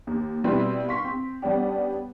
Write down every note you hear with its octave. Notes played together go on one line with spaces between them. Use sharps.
D#2
B2 G3 C4 E4 B4
F5 C6 C#6 B6
C4
G3 B3 C#4 D4 G4